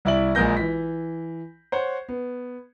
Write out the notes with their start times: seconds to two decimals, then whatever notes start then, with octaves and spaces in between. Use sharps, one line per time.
0.05 C2 E4 D5 E5 F#7
0.35 A#1 G#3 A#3 G6 A#6
0.57 E3 B6
1.72 C5 C#5 F#5
2.09 B3